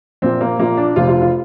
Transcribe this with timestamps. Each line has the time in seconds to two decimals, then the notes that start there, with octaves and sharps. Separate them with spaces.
0.22 A#1 A#2 C4
0.41 A#3
0.59 A#1 A#2 A#3
0.77 D4
0.96 F1 F2 C3 F4
1.08 F4
1.21 F4